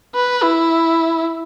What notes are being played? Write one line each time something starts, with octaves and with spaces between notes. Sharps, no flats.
B4
E4